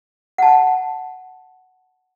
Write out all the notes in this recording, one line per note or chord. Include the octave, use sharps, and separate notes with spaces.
F#5 A5